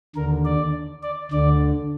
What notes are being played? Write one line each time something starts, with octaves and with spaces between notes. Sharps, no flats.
D#2 D3 A#4
D5
D5
D2 D3 D5